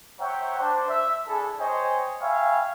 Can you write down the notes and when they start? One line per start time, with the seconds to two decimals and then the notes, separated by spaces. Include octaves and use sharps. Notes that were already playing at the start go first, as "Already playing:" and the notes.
0.20 C5 C#5 E5 F#5 G5 A#5
0.59 D4 C5
0.89 E5
1.27 D4 E4 G#4 A4
1.60 C5 C#5 D#5 G5 G#5
2.22 C#5 E5 F5 G5 G#5 B5